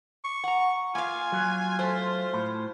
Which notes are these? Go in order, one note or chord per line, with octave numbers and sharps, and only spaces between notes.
C#6
F#5 A#5
A#3 F4 F5 G#5
F#3
A3 C5
A2 F4